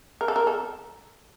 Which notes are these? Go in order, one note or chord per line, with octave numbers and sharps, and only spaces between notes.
A#4
A4
A#4
A4